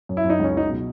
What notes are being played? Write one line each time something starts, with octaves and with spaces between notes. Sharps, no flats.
F#2
E4
F#2
D#4
C#2 C#4
F#3 D#4
B2